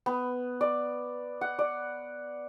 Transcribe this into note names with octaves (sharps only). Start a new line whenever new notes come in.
B3
D5
F#5
D5